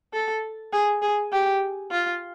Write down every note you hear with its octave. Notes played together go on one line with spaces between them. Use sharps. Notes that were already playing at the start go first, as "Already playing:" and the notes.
A4
G#4
G#4
G4
F4